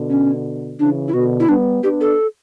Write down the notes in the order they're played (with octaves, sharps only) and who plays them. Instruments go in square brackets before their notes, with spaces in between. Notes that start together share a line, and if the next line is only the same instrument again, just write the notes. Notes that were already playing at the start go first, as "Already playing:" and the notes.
Already playing: [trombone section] B2 D3
[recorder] C#4
[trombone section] C#3 E3 [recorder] D4
[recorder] E4
[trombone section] B2 D3 [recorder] F#4
[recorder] E4
[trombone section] G3 B3 [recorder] D4
[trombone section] B3 D4 [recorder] G4
[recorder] A4